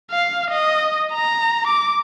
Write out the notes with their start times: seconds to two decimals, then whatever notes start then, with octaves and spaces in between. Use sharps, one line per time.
0.11 F5
0.50 D#5
1.13 A#5
1.67 D6